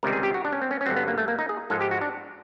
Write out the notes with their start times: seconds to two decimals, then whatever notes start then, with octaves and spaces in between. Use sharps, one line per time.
0.03 C#2 C3 D#3 G3 A#4
0.13 G#4
0.23 G4
0.34 F#4
0.45 D4
0.53 C#4
0.62 C4
0.71 C#4
0.81 C#4
0.86 G2 D3 F#3 C4
0.96 B3
1.08 A#3
1.18 A3
1.28 A#3
1.39 D#4
1.49 G#4
1.70 G#2 F3 G#3 A4
1.81 G4
1.91 F#4
2.01 D4